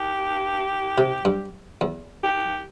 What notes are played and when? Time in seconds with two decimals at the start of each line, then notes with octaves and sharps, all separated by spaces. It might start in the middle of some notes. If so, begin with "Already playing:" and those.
Already playing: G4
0.98 C3
1.25 G2
1.81 E2
2.23 G4